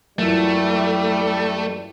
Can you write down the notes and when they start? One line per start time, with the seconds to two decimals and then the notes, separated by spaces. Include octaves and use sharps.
0.19 F#2 E3 F#3 G3 A3 E4 F4 A#4